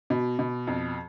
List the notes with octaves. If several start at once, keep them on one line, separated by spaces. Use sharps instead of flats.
B2
B2
F2